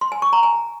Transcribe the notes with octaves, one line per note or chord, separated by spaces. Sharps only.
C6
G#5
C#6
A#5
G#5